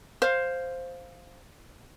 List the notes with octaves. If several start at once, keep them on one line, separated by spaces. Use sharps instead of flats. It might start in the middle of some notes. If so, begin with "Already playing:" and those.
C5 F5